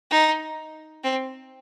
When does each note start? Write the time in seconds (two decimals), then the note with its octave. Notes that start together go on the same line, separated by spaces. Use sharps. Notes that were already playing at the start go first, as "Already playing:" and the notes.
0.11 D#4
1.04 C4